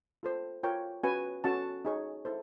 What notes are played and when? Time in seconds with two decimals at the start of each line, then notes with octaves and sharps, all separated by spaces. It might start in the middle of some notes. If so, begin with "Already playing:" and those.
0.23 F4 A4 C5
0.63 F4 A#4 C#5 G5
1.04 C#4 F#4 B4 G#5
1.44 C#4 F#4 A4 A5
1.85 D#4 G#4 C#5
2.25 E4 A4 C5